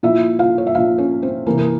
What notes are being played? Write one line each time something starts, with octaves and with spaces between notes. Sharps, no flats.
A#2 F3 E4 E5
F4 F5
C#5
E5
A#2 F3 F4 F5
C#4 C#5
C4 C5
C3 E3 A#3 A#4
A#4